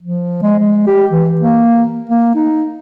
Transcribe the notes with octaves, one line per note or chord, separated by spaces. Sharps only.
F3
G#3
G#3
G4
E3
A#3
A#3
D#4